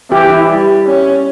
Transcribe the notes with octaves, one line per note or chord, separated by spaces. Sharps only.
E3 G4
E4
G3
C#4